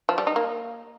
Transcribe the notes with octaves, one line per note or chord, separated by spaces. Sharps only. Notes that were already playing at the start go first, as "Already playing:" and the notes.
F3
G3
D#4
A#3